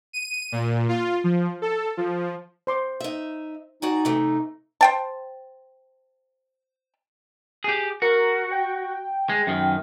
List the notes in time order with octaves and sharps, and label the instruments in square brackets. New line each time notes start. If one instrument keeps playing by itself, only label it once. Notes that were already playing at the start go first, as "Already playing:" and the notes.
[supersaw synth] D#7
A#2
F4
F3
A4
F3
[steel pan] C5 C6 D6
[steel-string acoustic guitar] D#4 E5
[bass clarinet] D#4 [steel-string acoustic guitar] F#4 D5 G#5
[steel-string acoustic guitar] C3 E3 A3
[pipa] C5 G5 A5
[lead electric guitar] G4 G#4
[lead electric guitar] F#4 [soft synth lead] A#4
[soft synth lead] G5
[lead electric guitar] G#3
F#2 D#3